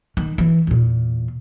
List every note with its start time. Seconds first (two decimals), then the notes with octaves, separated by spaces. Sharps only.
0.17 D#3
0.38 E3
0.67 E2 A#2